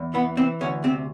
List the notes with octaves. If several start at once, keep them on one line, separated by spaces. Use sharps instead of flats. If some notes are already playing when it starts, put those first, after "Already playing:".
Already playing: E2
E3 B3
E3 C4
D2 C#4
C3 C4